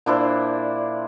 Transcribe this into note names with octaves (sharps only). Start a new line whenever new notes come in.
A#2 D4 E4 C5